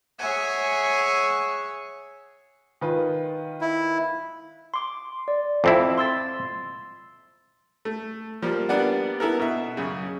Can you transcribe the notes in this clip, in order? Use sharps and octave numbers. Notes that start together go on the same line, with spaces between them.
G#4 C#5 E5 F#5 G#5
D#3 F4 B4
E4
C6 D6
D5
F2 C4 E4 D6
C6 E6 A6
A3
F3 G3 A#3
G3 A#3 B3 D4 D5 F#5
B3 E4 A4 A#4
B2 E5
F#2 C#3